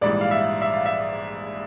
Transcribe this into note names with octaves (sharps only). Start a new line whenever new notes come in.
A#1 G#2 E3 G3 D5
F5
E5
E5
F5
E5